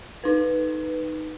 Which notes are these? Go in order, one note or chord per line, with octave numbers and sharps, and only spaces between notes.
D#4 B4